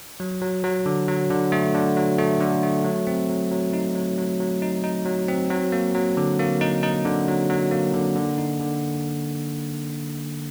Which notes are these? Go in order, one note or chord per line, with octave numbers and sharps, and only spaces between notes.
F#3
F#3
F#3
D3
F#3
D3
A3
D3
F#3
A3
D3
A3
F#3
C4
F#3
F#3
D#4
F#3
F#3
F#3
D#4
D#4
F#3
C4
F#3
A#3
F#3
D3
A#3
D#4
D#4
D3
F#3
F#3
A#3
D3
D3
D#4
D3